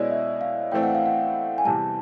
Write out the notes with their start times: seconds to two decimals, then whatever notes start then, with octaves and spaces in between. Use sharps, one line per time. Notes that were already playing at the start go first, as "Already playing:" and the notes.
Already playing: B2 G#3 C#4 E4 D5 D#5
0.11 E5
0.41 F5
0.72 A2 E3 A3 C4 G5
0.83 F#5
0.95 F5
1.06 F#5
1.58 G#5
1.65 E2 C3 E3 G3 A5